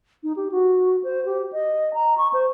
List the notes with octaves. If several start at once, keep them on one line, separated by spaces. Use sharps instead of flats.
D#4
G4
F#4
C5
G4
D#5
A#5
C#6
C5